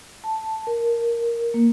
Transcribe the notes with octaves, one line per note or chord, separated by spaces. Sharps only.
A5
A#4
A#3